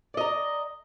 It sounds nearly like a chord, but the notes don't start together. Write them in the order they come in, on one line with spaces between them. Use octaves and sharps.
D5 D#5 A#5